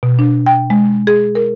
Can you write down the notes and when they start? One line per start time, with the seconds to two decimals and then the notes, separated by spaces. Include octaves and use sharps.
0.03 B2
0.19 D4
0.46 G5
0.70 G#3
1.07 G#4
1.35 A#4